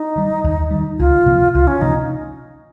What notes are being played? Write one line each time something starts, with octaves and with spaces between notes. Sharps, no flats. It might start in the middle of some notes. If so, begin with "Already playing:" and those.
Already playing: D#4
D#3 G3
D#2
D#3 G3
C#2 F4
C3 F3 A#3
C#2 F4
C#4
C3 F3 A#3 D#4